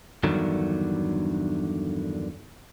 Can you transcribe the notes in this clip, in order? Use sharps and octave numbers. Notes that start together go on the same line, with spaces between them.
E2 G2 D3 D#3 F#3